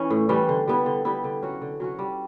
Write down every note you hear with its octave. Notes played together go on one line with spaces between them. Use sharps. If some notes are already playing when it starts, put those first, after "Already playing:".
Already playing: E3 C#4
A2
E3 G3 C#4
D3
G3 B3 E4
D3
G3 B3 E4
D3
F#3 C#4 F#4
D3
F#3 C#4 F#4
G3